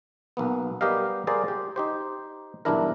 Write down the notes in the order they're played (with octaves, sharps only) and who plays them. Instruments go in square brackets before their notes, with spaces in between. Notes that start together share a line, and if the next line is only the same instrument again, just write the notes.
[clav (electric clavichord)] B1 A#3 B3
G3 B3 G4 A#4 D#5 F5
G3 G#4 A#4 C5 D5 F5
G4
D#4 G4 C5
B1 E2 G2 D4 E4 A#4